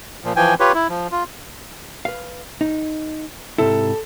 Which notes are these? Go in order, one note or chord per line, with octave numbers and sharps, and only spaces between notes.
A#2 F3
E3 F3 G5 G#5
F4 G4 B4 C#5
E4
F3
F4
B4 F5
D#4
G#2 C3 E4 A4